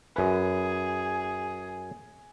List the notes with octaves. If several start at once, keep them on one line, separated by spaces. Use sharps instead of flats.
F#2 G#4 B4